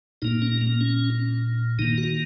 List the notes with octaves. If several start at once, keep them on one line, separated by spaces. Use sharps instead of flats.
A#2 A#3 D#4
C#4
A#3
C#4
D#3 A#3 D#4
F#4